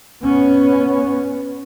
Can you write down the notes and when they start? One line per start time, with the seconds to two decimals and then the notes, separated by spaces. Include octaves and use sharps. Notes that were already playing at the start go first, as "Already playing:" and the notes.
0.24 B3 C#4